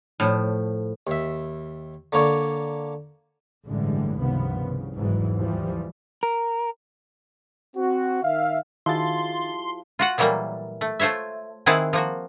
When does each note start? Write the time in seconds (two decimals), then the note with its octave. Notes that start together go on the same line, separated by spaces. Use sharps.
0.20 A2 F3
1.07 D#2 E5
2.13 D3 A#3 C#5 D5
3.66 A1 G2 D3 E3 G3 G#3
4.19 C#2 G2 C3 D#3 F3 B3
4.59 C2 C#3
4.95 F#1 E2 G#2 E3 F#3
5.37 D#2 E3 F3 G3
6.23 A#4
7.76 C4 F#4
8.23 D#3 E5 F5
8.86 D#3 F3 E4 F#4 G#4 C6 A6
9.99 F4 F#4 F#5
10.18 A#2 E3 F#3 G3 A3 A#3
10.81 A3
11.00 A3 F4 C5 C#5 E5
11.66 D#3 C4 E4 G#4 F#5 A5
11.93 F3 A#3 F#4